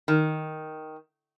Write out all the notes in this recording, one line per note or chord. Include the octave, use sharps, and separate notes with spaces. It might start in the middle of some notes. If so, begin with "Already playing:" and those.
D#3